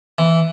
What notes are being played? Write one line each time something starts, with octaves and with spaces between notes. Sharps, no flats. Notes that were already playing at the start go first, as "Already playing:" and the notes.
E3